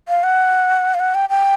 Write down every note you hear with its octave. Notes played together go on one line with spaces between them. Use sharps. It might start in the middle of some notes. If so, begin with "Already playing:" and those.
F5
F#5
F5
F#5
G5
G5